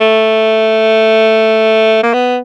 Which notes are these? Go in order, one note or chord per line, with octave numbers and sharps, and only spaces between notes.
A3
A#3
B3